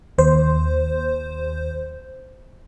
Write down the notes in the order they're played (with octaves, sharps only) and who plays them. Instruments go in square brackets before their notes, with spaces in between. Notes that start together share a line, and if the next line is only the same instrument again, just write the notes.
[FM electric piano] D#2 C5